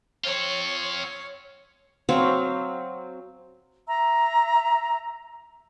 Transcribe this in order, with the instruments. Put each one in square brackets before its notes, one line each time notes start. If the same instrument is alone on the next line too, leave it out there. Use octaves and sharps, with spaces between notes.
[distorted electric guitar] C4 F4 [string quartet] C#5
[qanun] F#3 C4 C#5 F5
[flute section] E5 A#5 E6